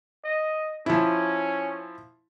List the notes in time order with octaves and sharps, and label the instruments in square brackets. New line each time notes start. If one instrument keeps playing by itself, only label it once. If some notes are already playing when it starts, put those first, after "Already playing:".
[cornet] D#5
[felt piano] F3 E4 [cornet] C#4